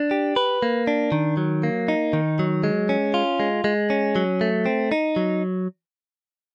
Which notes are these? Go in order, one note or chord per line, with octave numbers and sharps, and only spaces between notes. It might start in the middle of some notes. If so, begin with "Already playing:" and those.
Already playing: D4
G4
B4
A#3
D4
D#3
F#3
A#3
D#4
D#3
F#3
G#3
C#4
F4
G#3
G#3
C#4
F#3
A3
C4
D#4
F#3